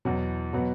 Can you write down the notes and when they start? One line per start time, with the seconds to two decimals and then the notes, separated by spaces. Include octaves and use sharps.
0.05 E2 B2 F#3
0.53 B2 F#3 B3